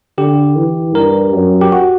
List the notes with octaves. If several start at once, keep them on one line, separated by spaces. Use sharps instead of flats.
D3 G4
E3
G2 A#4
F#2
G4
F#4